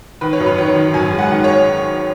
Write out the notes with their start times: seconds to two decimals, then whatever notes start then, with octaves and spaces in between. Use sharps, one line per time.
0.21 D#3 B4
0.33 C#5
0.40 F#2
0.46 B4
0.58 D#3 C#5
0.76 D#3
0.94 F#2 G#5
1.13 G#3
1.18 F#5
1.31 D#3
1.44 C#5